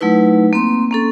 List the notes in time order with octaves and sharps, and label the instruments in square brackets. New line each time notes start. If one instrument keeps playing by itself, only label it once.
[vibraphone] F#3 A3 D#4 E4 B4
A#3 C4 C6
A#3 C#4 A4